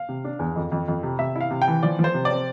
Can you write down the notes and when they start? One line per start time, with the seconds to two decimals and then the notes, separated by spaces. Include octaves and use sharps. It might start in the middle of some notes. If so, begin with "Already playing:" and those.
Already playing: F5
0.09 C3
0.25 D4
0.39 E2
0.56 F2
0.72 F2
0.88 F2
1.03 C3
1.19 C3 E5
1.36 E4 F5
1.51 C3
1.62 G5
1.68 E3
1.83 F3 D5
1.99 F3
2.04 C5
2.14 C3
2.25 D5
2.31 C4